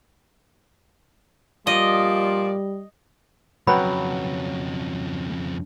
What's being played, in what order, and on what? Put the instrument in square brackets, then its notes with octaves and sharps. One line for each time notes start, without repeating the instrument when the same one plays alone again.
[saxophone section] A#2 F3 D5 [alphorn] G3 [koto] D#5
[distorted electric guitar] F2 C#3 [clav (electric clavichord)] F#3 F#5 G5 [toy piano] B4 B5